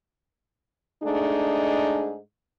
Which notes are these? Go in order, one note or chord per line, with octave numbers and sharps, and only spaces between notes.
G#2 A3 D4 D#4 G#4